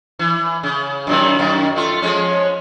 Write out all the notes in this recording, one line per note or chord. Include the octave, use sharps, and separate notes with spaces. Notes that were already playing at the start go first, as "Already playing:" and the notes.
E3
C#3
F#2 A#2 D#3
F#2 D#3
A3 F4
F3 G#3 C#4